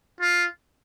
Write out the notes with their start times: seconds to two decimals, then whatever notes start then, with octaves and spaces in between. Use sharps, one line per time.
0.21 F4